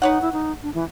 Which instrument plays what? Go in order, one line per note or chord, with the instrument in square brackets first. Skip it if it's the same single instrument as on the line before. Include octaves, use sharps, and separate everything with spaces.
[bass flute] D#4 [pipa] B4 C#5 F#5
[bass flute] E4
D#4
D4
E3